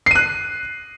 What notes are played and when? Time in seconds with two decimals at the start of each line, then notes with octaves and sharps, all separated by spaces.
0.06 C7
0.11 D#7
0.15 F#6